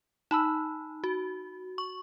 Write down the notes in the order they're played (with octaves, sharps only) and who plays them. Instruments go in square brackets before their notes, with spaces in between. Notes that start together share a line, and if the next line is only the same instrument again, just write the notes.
[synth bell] D#4 [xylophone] A5 B5 E6
[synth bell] F#4
C#6